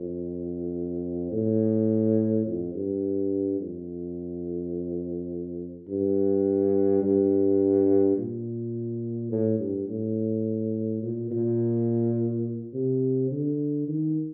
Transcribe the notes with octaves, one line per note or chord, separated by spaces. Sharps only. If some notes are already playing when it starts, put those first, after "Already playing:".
Already playing: F2
A2
F2
G2
F2
G2
G2
A#2
A2
G2
A2
A#2
A#2
C3
D3
D#3